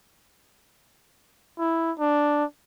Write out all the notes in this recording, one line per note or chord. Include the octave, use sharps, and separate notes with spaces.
E4
D4